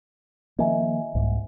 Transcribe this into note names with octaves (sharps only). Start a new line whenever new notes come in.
D#3 F3 A#3 D#5 E5 G#5
C2 G#2